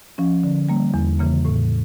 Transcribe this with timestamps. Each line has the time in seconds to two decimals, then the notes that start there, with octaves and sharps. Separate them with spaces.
0.18 F3 C#4
0.43 D3
0.69 G3 A#3
0.94 E2
1.19 C#3 E3 A#3
1.45 A2